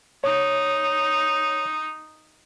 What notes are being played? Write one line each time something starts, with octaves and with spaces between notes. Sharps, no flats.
D#4 C#5